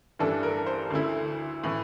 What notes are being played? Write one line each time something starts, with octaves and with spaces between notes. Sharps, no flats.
G2 E3 A3 D4 A4
A#4
C5
D2 D3 A3 E4
A2 E3